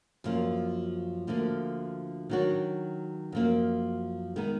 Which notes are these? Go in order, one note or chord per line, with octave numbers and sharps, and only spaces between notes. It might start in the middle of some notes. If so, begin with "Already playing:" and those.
F#2 F3 A#3 F4
D2 D3 F3 A#3
D#3 F#3 D4 F#4
F#2 F3 A#3
D#3 G#3 B3 D#4